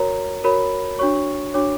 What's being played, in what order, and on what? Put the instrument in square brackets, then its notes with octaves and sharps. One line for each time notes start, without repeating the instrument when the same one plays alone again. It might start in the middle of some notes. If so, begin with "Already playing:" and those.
Already playing: [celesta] F#4 A#4 C#5 A#5
F#4 A#4 C#5 B5
D4 F#4 C#5 C#6
D4 F#4 C#5 D6